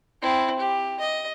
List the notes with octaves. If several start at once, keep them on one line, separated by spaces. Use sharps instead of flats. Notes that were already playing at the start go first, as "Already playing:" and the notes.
C4 E4
G4
D#5